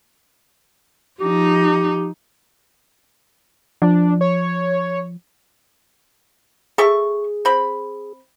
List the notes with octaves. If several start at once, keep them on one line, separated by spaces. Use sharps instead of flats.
F3 D#4 G4
F3 D4
C#5
G#4 A4 E5 C#6
C4 B5